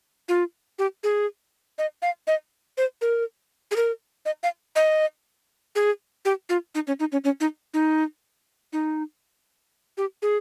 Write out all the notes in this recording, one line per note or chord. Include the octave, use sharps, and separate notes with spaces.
F4
G4
G#4
D#5
F5
D#5
C5
A#4
G#4
A#4
D#5
F5
D#5
G#4
G4
F4
D#4
C#4
D#4
C#4
C#4
D#4
D#4
D#4
G4
G#4